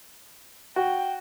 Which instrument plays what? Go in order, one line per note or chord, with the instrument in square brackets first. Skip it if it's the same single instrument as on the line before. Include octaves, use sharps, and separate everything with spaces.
[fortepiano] F#4 [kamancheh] G5